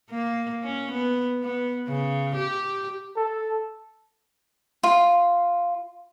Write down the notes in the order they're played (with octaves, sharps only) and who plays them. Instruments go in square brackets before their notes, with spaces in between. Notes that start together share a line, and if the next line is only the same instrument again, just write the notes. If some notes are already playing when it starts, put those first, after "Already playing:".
[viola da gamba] A#3
C#4
B3
B3
C#3
G4
[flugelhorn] A4
[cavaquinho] F4